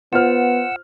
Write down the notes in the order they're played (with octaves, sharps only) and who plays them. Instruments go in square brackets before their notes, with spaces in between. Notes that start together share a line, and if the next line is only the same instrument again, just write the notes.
[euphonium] B3 [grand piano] F4 C5 F6 [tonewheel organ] F#5 E6